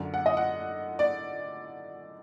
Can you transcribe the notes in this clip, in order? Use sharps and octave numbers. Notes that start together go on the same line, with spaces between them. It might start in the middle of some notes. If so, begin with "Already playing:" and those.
Already playing: F#2 D3
F#5
D#5
F#5
D5